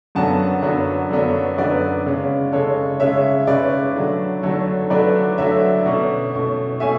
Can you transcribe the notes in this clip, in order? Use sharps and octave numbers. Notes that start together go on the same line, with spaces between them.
F#2 D3 F#3 B3 D4 F#5 A5
F#2 D3 F#3 B3 D4
F#2 D3 F#3 B3 D4
F#2 D3 F#3 B3 D4 B4 D5
C#3 G#3 C#4
C#3 G#3 C#4 A4 C#5
C#3 G#3 C#4 C#5 E5
C#3 G#3 C#4 B4 D5
D3 F#3 A3 D4
D3 F#3 A3 D4 A4 C#5
D3 F#3 A3 D4 B4 D5
D3 F#3 A3 D4 C#5 E5
B2 A3 C#4
B2 A3 C#4
B2 A3 C#4 E5 G#5